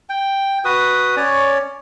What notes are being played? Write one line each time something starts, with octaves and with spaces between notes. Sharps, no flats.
G5
F#4 B4 D#6
C#4 C#5 D5